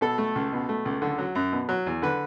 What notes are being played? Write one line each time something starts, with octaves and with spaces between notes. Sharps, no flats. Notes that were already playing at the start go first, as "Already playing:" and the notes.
B2 A4
A3
C#2
B2
A3
C#2
D3
F#3
F#2
B2
F#3
E2
D3 B4